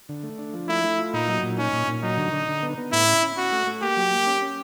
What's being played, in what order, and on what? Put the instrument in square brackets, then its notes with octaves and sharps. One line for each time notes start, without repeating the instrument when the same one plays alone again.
[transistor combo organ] D3
A3
D4
F3
[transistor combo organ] A3 [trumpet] E4
[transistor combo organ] A3
F4
[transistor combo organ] A#2 [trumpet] D#4
[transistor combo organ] F#3
A#2
[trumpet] C#4 [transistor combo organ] D#4
[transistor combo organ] A#2
A#2
[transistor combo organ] F#3 [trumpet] D#4
[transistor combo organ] D3
D3
D3
B3
B3
[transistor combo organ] A2 [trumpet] E4
[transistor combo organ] C#4
C#4
[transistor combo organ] C#4 [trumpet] F#4
[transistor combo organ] A3
A3
[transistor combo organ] A#3 [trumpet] G4
[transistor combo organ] F#3
A#3
C#4
C#4